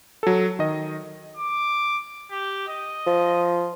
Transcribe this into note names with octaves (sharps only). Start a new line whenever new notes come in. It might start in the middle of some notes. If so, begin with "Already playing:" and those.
F#3 A4
D#3 D#5
D6
G4
D#5
F3